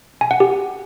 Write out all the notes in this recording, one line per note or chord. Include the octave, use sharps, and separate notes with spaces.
G#5
F#5
G4